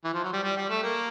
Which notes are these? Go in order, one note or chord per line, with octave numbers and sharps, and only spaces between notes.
E3
F3
F#3
G3
G3
G3
A3
A#3